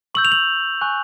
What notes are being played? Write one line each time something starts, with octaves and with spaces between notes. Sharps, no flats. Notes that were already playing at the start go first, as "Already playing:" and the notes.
C#6 E6 G6 F#7
F7
F#7
G#5 C#6 F#6